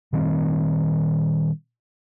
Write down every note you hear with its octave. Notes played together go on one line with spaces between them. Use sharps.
A#2 D#3 G3 C4